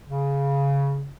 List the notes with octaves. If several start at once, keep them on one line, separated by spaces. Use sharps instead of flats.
C#3